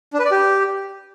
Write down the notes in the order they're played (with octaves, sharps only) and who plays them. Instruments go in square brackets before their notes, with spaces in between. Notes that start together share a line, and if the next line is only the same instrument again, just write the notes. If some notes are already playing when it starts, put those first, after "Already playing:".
[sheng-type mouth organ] D4
B4
D5
G4